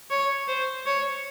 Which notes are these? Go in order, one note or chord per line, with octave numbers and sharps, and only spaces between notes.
C#5
C5
C#5